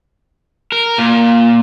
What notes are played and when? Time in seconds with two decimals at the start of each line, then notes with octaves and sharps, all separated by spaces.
0.72 A#4
0.99 A#2